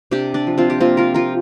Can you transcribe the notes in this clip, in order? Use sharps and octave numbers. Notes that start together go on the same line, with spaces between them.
C3 D4 G4
D4
F3
C4 F4
G4
A#3 C4 F4
F4 A#4
F3 F4 A#4